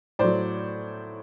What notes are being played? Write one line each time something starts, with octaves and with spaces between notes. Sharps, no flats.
A2 F#3 C5 D5